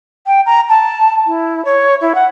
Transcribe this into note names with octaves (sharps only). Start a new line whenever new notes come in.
G5
A#5
A5
E4
C#5
E4
F#5